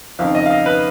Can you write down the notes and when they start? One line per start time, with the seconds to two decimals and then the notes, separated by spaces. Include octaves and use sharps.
0.19 F#1 F2 D#3 F5
0.35 D#5
0.46 F5
0.50 D#5
0.66 B4